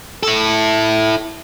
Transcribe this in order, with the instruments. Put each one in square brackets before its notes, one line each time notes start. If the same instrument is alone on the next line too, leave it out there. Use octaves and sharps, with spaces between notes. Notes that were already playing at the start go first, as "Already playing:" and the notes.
[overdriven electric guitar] E4 A4